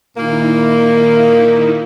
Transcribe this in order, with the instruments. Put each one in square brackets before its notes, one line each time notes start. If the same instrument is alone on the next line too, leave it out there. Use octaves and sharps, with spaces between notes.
[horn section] A#2 A#3 [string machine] D#3 D#4 E4